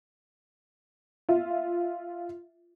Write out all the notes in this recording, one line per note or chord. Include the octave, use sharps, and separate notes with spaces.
F4 E5